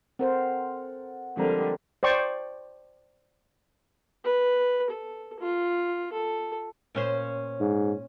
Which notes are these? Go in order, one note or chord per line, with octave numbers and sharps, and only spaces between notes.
C4 A4 A#4 C5 F#5
D3 F3 G3 G#3 C4 A#4 F5
C5 D5 G5 C#6
B4
A4
F4
A4
A#2 C#4 C5
G#2